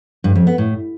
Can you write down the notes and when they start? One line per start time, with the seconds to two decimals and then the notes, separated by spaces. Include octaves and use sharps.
0.24 G2
0.35 F2
0.47 B3
0.58 A2